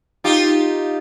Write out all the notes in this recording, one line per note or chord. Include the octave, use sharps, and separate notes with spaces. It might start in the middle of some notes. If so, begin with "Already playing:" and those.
D#4 F4 G4